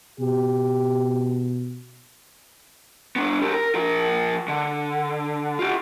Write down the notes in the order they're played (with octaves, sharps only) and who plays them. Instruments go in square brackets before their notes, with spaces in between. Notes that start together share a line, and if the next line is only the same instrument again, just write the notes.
[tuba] B2 [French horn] G4
[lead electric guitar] B3 D4
G4 A#4
A#4
F3 A#4
D3
F4 G4